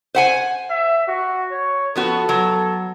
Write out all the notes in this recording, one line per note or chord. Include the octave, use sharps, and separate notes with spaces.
C5 F#5 G#5
E5
F#4
C#5
F3 B3 F#4 A4
F#3